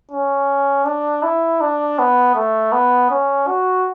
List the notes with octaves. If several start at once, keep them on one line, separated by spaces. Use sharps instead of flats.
C#4
D4
E4
D4
B3
A3
B3
C#4
F#4